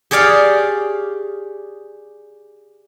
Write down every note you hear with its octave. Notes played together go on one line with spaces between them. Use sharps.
G4 G#4 C#5 D5 F5